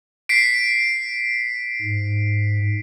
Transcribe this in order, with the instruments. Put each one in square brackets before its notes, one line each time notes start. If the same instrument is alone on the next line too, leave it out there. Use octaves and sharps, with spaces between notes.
[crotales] B6 C7 D7
[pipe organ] G#2